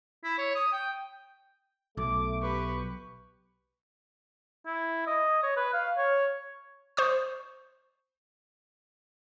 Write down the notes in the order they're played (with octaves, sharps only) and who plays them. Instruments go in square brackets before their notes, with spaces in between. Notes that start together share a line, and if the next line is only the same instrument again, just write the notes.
[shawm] E4
C#5
D#6
G5
[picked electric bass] B1 [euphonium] A3 [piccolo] D6
[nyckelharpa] G4 B4 [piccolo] C#6
[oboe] E4
D#5
C#5
B4
F5
C#5
[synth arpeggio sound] C5 C#6 D#6